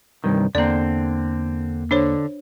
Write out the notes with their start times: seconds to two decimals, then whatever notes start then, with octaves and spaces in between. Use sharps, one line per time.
0.24 C2 G2 D#3
0.55 E2 D3 A#3 C4 D5 A#5
1.91 D3 D4 C5 C#5